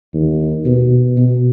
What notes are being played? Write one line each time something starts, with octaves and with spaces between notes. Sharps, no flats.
D#2
B2
B2